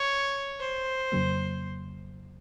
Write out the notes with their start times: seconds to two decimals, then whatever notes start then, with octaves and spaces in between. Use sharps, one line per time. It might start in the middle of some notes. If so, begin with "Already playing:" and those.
Already playing: C#5
0.60 C5
1.12 F2 C#3 F#3 A#3